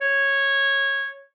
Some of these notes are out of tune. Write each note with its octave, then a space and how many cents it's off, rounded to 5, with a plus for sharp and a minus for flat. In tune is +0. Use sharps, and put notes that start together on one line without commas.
C#5 -10